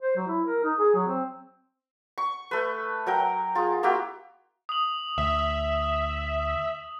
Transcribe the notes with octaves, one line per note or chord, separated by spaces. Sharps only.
C5
F#3
E4
A#4
D#4
G#4
F#3
C4
C#6
A3 B4
F#3 A#4 G5
F4 G#4
A#3 E4 F#4 G4
D#6 F#7
D2 E5